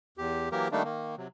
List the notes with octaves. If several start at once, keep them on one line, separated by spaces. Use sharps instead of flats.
E2 G4
E3 F#3 A#3 G4 A#4
D#3 G3 A3 A#3 D4 D#4
D#3 A#3
C3 F#3